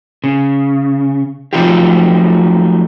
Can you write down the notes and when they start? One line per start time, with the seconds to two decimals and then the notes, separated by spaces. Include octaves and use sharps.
0.24 C#3
1.53 F3 F#3 A3 D#4 F4 G4